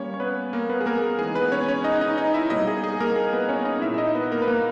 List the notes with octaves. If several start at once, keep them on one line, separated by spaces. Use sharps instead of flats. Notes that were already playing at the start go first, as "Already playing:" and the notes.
Already playing: G3 A#3 C#4 C#5
C#5
B3 B4
A#3 A#4
B3 B4
G#4
A#3 A#4
G#4
E3 G#3 D#4 G#4
B3 B4
C#4 C#5
C#4 C#5
D#4 D#5
D#4 D#5
D#4 D#5
E4 E5
B2 G3 A#3 D#4 D#5
G#4
G#4
A#3 A#4
G#4
B3 B4
C#4 C#5
D#4 D#5
A#2 A#3 D#4 E4 E5
E5
D#4 D#5
B3 B4
A#3 A#4
B4
A#3 A#4